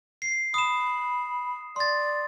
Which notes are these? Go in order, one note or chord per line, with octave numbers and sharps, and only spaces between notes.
C7
B5 D#6 E7
D5 C6 A6